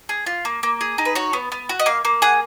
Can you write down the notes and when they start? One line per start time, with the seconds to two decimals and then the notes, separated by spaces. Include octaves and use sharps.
0.09 G#4
0.26 F4
0.45 A#3
0.63 A#3
0.81 G#4
0.98 D#4
1.05 B4
1.15 F#4 C#5
1.33 B3
1.52 B3
1.69 F#4
1.79 D#5
1.86 A#3 F5
2.05 A#3
2.22 G#4 F#5